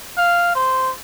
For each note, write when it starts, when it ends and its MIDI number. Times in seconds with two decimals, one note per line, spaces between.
0.17 0.53 77
0.55 0.92 72